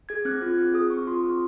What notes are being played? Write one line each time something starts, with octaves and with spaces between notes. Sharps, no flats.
G#4 G#6
C4 F#6
F4
C4
G#4 D#6
C4 C#6
F4 C6
C4 C#6